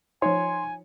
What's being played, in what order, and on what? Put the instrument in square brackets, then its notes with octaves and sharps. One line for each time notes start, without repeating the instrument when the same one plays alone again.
[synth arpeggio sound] F3 D#4 [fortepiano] C#5 [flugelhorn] G#5 [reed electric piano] C6